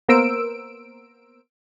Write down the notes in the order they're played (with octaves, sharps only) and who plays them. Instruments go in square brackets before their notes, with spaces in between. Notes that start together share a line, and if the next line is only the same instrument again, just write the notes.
[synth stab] A#3 B3 A#4 C5 E6 D7